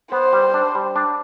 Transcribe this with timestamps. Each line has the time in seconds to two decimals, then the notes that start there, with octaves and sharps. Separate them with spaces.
0.12 B3 C5
0.33 G3
0.54 D4
0.75 G3
0.96 D4